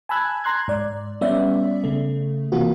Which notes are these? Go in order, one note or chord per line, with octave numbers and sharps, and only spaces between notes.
G#5 A5 B5 E6 F#6 G#6
A#5 C6 F#6 G#6
G#2 D5
G3 B3 C#4 D5 E5
C#3 A3
C3 E3 A#3 F4 F#4